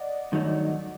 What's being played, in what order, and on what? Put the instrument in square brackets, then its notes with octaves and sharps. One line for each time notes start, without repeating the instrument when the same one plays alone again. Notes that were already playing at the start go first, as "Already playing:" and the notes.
Already playing: [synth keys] D5 D#5 F#5
[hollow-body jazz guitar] G2 D#3 F#3 A3 D#4